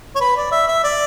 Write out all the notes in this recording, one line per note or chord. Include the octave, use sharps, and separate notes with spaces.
C#5
B4
D5
E5
E5
D5